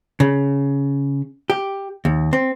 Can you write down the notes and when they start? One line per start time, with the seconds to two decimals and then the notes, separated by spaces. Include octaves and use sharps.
0.20 C#3
1.50 G4
2.05 D#2
2.33 C4